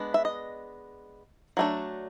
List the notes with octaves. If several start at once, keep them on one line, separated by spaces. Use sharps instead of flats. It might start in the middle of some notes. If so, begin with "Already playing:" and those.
Already playing: G#3 B3 D4
E5
D#5
F#3 A3 D4